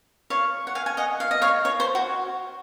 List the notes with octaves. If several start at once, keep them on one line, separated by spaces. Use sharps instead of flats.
C#5 F5
F#5
F5 G#5
G#5
D#5 F#5
F5
D#5
C#5 F5
C#5
C5
F#4